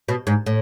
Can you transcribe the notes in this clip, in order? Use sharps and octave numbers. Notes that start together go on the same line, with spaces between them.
B2
G#2
A2